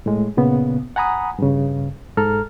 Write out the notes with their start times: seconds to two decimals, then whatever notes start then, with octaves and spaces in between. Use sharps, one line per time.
0.06 A2 G#3
0.37 A#2 C#3 B3
0.96 F#5 G#5 A#5 B5 D#6
1.39 G2 C#3
2.17 G#2 A4 A#5 F6